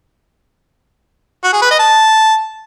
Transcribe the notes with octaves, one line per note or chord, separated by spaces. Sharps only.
F#4
G#4
B4
D#5
A5